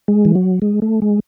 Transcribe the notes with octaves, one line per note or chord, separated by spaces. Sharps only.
G#3
E3
F#3
G#3
A3
G#3